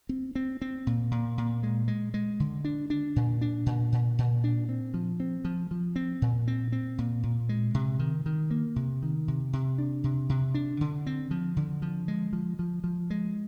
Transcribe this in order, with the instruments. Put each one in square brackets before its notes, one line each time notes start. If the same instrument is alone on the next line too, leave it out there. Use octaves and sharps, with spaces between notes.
[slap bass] C4
C4
C4
A#2
A#2
A#2
G#3
G#3
G#3
D3
D4
D4
A#2
D4
A#2
A#2
A#2
D4
C4
F3
C4
F3
F3
C4
A#2
C4
C4
A#2
A#2
G#3
C3
D#3
D#3
A#3
C3
D#3
C3
C3
D4
C3
C3
D4
D3
C4
F3
D3
F3
G#3
F3
F3
F3
G#3